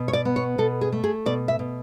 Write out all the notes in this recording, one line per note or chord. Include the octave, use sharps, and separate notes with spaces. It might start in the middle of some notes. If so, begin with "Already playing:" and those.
Already playing: B2
C#5
D5
B3
C#5
B2 A4
G#4
A3
G#4
B2 D5
E5
B2